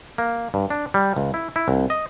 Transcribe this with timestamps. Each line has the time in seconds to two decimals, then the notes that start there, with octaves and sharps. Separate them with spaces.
0.18 A#3
0.54 G2
0.70 D4
0.94 G3
1.16 C#2
1.34 E4
1.56 E4
1.68 C2
1.90 D#5